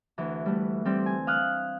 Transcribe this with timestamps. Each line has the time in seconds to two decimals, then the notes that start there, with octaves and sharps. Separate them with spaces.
0.18 D2 E3
0.46 G3 A3
0.85 G3 C4 G4
1.06 G#5
1.27 F5 D#6 F6 F#6